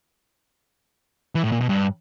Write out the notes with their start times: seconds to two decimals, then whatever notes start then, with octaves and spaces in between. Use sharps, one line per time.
1.35 E3
1.44 A2
1.52 A#2
1.61 B2
1.69 G2